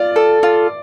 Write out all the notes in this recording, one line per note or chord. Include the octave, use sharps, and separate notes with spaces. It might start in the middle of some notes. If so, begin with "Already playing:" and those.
Already playing: F4 D5
A4
F4